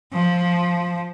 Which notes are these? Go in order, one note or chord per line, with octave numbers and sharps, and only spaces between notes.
F3